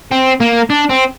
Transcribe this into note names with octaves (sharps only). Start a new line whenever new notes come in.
C4
A#3
D4
C4